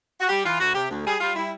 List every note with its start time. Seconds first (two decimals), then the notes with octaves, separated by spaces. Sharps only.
0.21 F#4
0.29 G3 G4
0.44 E3 F4
0.60 D2 F#4
0.74 C3 G4
0.90 D2
1.05 G3 G#4
1.20 G3 F4
1.35 G3 E4